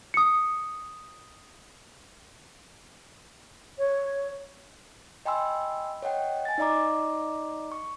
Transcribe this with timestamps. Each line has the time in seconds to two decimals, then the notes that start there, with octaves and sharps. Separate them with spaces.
0.14 D#6 C#7
3.79 C#5
5.25 D#5 G5 G#5 B5 C6 E6
6.02 C#5 D#5 F#5 G5
6.45 G#5 A6
6.58 D#4 D5 D#5 A#5 D6
7.72 C#6